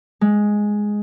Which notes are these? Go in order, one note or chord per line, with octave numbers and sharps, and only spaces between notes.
G#3